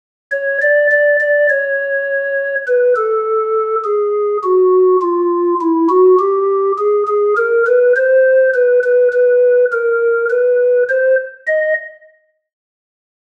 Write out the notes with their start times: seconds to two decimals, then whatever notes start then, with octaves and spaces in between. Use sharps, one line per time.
0.32 C#5
0.61 D5
0.91 D5
1.20 D5
1.50 C#5
2.67 B4
2.96 A4
3.85 G#4
4.44 F#4
5.01 F4
5.61 E4
5.89 F#4
6.19 G4
6.78 G#4
7.08 G#4
7.37 A#4
7.67 B4
7.96 C5
8.54 B4
8.84 B4
9.12 B4
9.72 A#4
10.30 B4
10.89 C5
11.47 D#5